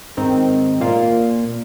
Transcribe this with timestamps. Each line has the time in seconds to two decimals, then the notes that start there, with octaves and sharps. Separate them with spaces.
0.17 G#2 D#3 C4 D#4
0.81 A#2 A#3 F4